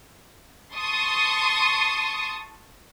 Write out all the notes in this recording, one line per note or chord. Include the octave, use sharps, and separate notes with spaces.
A5 C6 C#6 D#6